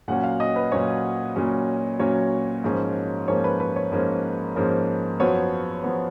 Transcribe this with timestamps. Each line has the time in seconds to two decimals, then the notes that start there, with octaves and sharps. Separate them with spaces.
0.08 A#2 F#3 C#4 F#5
0.24 F5
0.40 D#5
0.56 B4
0.71 A#2 F#3 C#4 C#5
1.36 A#2 F#3 C#4
1.99 A#2 F#3 C#4 C#5
2.64 G#2 F3 A#3 C#4
3.28 G#2 F3 A#3 C#4 C#5
3.44 B4
3.60 B4
3.76 C#5
3.92 G#2 F3 A#3 C#4
4.56 G#2 F3 A#3 C#4
5.20 F#2 F3 B3 C#5
5.84 F3 B3